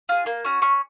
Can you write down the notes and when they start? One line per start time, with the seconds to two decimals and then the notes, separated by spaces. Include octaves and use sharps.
0.09 F4 G#4
0.26 A#3
0.45 C#4 F#4
0.62 C#4 C#6